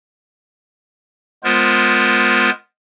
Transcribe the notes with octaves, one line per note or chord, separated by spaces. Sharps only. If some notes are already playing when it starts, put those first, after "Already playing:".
G#3 B3 F4 A#4 C5